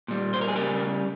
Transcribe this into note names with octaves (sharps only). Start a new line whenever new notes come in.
A#2 G3
C5
A#4
G#4
C#3 G3 G4 A#4